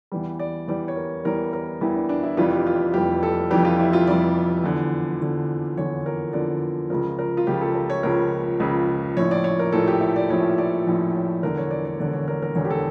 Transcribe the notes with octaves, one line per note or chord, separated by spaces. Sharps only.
E2 E3 G3
D5
E2 E3 G3 D5
C#5
A#4
E2 E3 G3 A#4
A#4
E2 E3 G3 E4
D4
D4
E4
F1 F2 E3 G3 F4
G4
F4
F1 F2 E3 G3 G4
A4
F1 F2 E3 G3 G4
F4
E4
F4
F1 F2 E3 G3 D5
E2 D3 F3
E2 D3 F3
E2 D3 F3 C#5
A#4
E2 D3 F3 D5
C#2 C#3 F3 A#4
A#4
F4
C#2 C#3 F3 G4
A4
A#4
C#5
C#2 C#3 F3 A#4
C#2 C#3 F3
A#1 A2 F3 C#5
D5
C#5
A#4
A#1 A2 F3 A4
G4
E4
D5
A#1 A2 F3 C#5
D5
A#1 A2 F3
C#5
E1 E2 D3 A#4
C#5
D5
C#5
E1 E2 D3 D5
C#5
A#4
A#4
E1 E2 D3 C#5
G4
A4